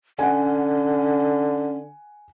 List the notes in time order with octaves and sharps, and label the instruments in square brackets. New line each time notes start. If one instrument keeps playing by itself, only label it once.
[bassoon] D3 [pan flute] C#4 [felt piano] F#5 G#5